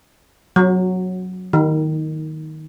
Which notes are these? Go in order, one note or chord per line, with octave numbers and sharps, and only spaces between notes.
F#3
D#3